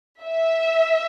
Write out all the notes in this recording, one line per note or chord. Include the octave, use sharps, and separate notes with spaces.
E5